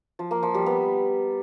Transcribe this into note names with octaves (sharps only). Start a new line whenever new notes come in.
F3
A#3
F3
G3
B3